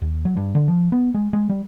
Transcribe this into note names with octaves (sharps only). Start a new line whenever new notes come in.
D#2
F#3
G2
D3
F3
B3
G#3
G#3
G3